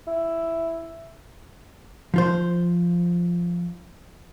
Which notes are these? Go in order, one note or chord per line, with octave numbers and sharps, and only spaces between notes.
E4
F3 F4 C5